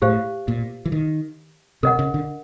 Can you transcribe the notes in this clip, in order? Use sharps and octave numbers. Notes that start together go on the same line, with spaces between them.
A2 G4 C5 F5
A#2
E3
D#3
C3 A#4 D#5 F#5
C#3
D3